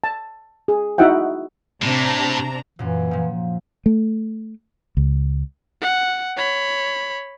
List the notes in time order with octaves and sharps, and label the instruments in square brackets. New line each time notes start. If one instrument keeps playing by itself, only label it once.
[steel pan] A5
G#4
D#4 E4 F#4 E5 F#5 G5
[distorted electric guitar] A2 [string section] C3 D4 A#5
[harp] F#2 A#2 [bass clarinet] E3
[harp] A#2 F3
[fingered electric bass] A3
C#2
[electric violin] F#5
C#5 B5